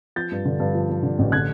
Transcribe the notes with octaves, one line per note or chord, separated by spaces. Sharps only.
F3 G6 A6
G2
D3
G2
F3
F3
D3
A1
D3 F#6 G#6